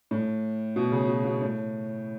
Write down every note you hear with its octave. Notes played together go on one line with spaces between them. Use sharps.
A2
B2
C#3
B2
B2
A2